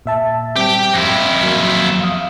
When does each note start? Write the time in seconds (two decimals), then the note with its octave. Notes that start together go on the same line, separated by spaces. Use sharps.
0.06 A#2 E5 A5
0.57 G3 C4 G4 G5
0.93 F2 E4 A#6
1.43 F#3 A#3
2.03 F5 D#6